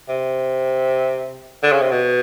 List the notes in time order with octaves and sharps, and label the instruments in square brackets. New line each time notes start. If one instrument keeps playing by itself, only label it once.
[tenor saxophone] C3
D3
C#3
C3
B2